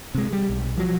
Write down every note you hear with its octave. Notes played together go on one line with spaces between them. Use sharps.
C3 G#3
G3
B1
F3 F#3